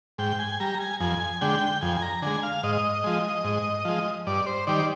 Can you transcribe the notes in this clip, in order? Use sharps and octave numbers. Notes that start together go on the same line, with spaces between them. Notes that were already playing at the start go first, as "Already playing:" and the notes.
G#2 G5
G#5
G3 A#5
G#5
F2 G#5
D3 G#3 G5
F2 G#5
G#5
A#5
D3 G#3 G#5
F5
G#2 D#5
F3 G#3
G#2
F3 G#3
G2 D5
C5
D#3 G3 D5